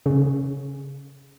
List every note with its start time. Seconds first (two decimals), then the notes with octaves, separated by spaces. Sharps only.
0.06 C#3